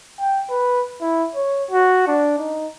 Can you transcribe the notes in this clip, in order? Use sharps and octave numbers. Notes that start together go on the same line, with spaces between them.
G5
B4
E4
C#5
F#4
D4
D#4